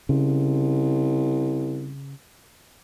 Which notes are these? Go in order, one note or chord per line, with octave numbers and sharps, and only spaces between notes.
C2 C#3